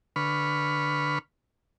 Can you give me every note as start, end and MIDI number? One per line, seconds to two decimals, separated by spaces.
0.16 1.19 50
0.16 1.19 71
0.16 1.19 83
0.16 1.19 85
0.16 1.19 89